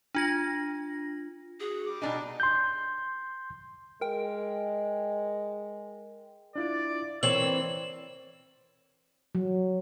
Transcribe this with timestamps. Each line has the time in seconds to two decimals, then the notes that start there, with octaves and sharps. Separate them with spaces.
0.15 D4 F4 A#6
1.60 F#4 G#4
1.86 G3 D6
2.02 B2 D4 D#4 D#5 G#5
2.40 C6 G6
4.01 G#3 A#4 G5
6.56 D4 E4 F4 D5
7.23 E3 C4 A#4 C#5 D5 E6 F#7
9.35 F#3